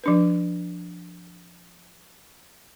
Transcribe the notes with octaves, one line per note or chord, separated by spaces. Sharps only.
F3 D4 B4